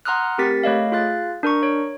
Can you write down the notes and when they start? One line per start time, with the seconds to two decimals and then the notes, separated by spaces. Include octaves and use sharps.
0.05 F#5 A#5 C6 D#6 F6 F#6
0.38 A3 C4 G4 A#4 A6 B6
0.63 A3 C#5 D#5 F5
0.92 F4 G#4 F5 F#6 A6
1.43 D4 A#4 A#5 C#6
1.63 C#5